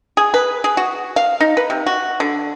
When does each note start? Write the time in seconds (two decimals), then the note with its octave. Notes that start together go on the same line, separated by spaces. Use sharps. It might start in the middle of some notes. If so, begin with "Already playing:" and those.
0.17 G#4
0.34 B4
0.64 G#4
0.77 F#4
1.16 F5
1.41 D#4
1.57 B4
1.70 C3
1.86 F#4
2.20 D3